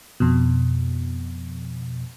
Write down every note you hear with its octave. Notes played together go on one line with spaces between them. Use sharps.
F2 B2